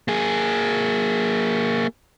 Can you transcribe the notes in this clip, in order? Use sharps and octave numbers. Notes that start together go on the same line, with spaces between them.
A#3 G#4